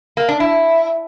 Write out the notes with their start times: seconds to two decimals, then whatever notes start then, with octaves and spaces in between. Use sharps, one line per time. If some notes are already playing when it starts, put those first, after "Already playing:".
0.17 A#3
0.29 D4
0.40 E4